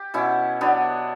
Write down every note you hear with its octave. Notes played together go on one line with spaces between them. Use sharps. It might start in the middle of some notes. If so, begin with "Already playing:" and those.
Already playing: G4
B2 C#4 E4
F#3 B3 D4